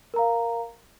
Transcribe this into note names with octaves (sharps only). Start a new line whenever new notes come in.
A#4 F5 A#5